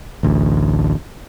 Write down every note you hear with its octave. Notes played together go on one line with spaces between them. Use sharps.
A1 D2